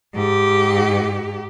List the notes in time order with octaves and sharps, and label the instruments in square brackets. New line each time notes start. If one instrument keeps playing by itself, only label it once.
[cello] G#2 G4